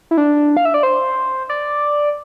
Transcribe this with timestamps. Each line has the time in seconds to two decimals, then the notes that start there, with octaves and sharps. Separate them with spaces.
0.11 E4
0.17 D4
0.57 F5
0.65 E5
0.74 D5
0.83 C5
1.49 D5